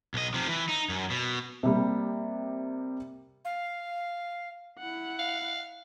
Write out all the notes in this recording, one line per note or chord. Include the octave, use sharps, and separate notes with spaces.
B1 D#5
C3 F3
E3
D#4
F#2
B2
C3 G3 A#3
F5
E4 F#5
F5